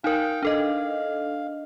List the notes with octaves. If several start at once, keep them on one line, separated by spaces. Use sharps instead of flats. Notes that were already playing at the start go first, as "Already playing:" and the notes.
D#4 A#4 F5 G5
D4 A4 D#5 F5